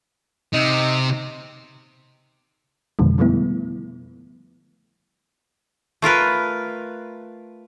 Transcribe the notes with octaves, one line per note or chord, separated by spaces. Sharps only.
C3 D#4
F2 B2 D3 D#3 F3 G#3
D3 F3 G3 A3 B3 E4
A3 F4 A#4 B4